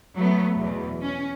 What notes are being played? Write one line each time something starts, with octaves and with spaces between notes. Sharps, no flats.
F#3 A3 B3
E2 B2
C#4